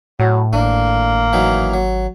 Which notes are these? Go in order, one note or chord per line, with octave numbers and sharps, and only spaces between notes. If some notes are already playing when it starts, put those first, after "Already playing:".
A2 F#3
G#1 A#3 D4
E3 F#3 D#4
F#3